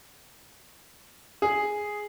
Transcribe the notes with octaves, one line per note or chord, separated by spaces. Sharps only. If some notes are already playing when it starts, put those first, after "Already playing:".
G#4